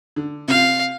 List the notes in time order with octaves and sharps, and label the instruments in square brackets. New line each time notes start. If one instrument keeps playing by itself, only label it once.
[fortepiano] D3
[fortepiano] C3 F4 [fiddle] F5